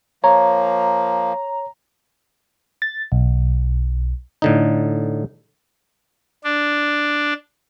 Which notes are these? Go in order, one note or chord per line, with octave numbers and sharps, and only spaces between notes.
F3 A#3 C#5 A#5
A6
B1
A2 D3 D#4
D4